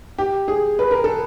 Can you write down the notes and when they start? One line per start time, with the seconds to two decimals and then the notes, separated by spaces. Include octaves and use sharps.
0.18 G4
0.48 G#4
0.79 B4
0.91 A#4
1.04 A4